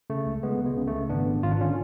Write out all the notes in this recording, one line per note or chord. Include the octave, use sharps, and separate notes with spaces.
C#3 A3
C#2
C#2 G#3 B3
C#2
G#3 B3
C#3
A3
C#3
G#1 B3 D4
G#1
G#1 F4
D4
D3 C#4 F4